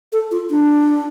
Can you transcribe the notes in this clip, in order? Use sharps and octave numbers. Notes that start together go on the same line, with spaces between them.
A4
F4
D4